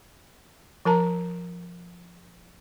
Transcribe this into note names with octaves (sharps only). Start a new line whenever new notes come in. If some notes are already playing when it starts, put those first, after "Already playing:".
F3 A#4 A5 A#5